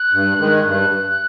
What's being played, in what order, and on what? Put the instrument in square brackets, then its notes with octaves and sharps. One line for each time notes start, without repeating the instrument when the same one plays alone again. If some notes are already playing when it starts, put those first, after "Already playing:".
Already playing: [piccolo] F#6
[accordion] G2
D#3 G#3
[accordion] G2 [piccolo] F#6